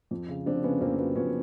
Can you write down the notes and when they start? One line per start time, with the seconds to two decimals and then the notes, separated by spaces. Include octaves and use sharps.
0.11 F2
0.28 C#3
0.46 F1 C4 D4
0.64 C#3 B3 C#4
0.81 F2 A#3 C4
0.98 F#3 B3
1.16 F2 B3 C#4